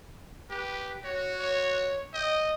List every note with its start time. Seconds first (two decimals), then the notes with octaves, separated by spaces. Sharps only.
0.50 G4 B4
1.03 F#4 C#5
1.40 C#5
2.14 D#5 G5